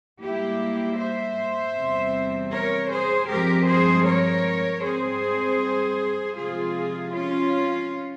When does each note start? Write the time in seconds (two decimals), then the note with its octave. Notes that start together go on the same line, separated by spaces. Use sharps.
0.21 G#2 G3 A#3 E4 G4
0.98 C5 E5
1.75 E2 C3 G3 C4
2.51 A#4 C#5
2.91 G#4 C5
3.29 G2 F3 G#3 C4 G4 A#4
3.66 G#4 C5
4.05 A#4 C#5
4.82 G#2 G3 C4 G#4 C5
6.36 C3 F3 G#3 F4 G#4
7.13 C#4 F4